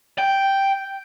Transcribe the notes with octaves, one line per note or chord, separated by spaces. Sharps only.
G5